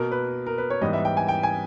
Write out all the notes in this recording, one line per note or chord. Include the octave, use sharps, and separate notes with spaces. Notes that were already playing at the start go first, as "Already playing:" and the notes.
Already playing: B2 A#3 A#4
B4
A#4
B4
C#5
G#2 E3 G3 B3 D#5
E5
G5
G#5
G5
G#5